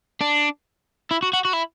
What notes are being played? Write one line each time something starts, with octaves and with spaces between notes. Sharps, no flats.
D4
E4
F#4
F#4
F#4
E4